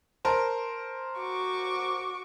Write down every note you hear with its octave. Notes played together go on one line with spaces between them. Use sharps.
A#4 C5 A5
F#4 C#6 D6